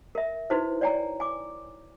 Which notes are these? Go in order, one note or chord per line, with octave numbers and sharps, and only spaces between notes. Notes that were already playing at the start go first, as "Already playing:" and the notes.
A#4 E5
D#4 E4 F#4 B4 C5
C#5 D5 G5 G#5 A#5
G#5 D6